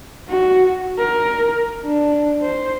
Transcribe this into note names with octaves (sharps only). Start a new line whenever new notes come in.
F#4
A#4
D4
C5